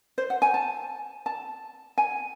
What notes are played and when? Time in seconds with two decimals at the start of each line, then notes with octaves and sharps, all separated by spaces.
0.18 C5
0.30 F#5
0.42 G#5
0.54 A5
1.26 A5
1.98 G#5